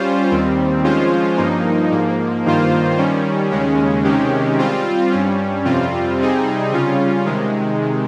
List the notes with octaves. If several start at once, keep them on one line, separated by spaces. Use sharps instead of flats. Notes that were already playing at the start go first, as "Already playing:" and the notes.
Already playing: G3 C#4 F4 C5
D#2 D#3 G3 C4
F3 G#3 C#4 F4 C5
G2 F3 A#3 D#4
G#2 F3 A#3
G2 D#3 A#3 F4 C5
D#3 G3 C#4
D#2 C#3 G#3 C#4
C3 D#3 G#3 C#4 G4
G3 C4 F4
G2 G3 C#4
F2 C3 G3 C4 F4
C3 G3 C4 D#4 G#4
C#3 G3 C#4 F4
C3 D#3 G#3